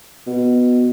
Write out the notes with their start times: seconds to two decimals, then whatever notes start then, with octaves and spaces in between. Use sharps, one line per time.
0.27 B2